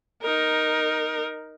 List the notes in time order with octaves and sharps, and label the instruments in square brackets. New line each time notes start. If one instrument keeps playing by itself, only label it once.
[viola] D#4 A#4